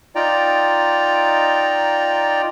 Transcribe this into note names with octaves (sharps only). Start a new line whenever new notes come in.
D#4 F4 D5 G5 A#5